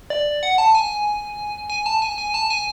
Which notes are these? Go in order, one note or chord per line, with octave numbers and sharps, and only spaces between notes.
D5
F#5
A5
G#5
G#5
A5
G#5
G#5
A5
G#5